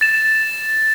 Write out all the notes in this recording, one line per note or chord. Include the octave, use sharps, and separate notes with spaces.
A6 E7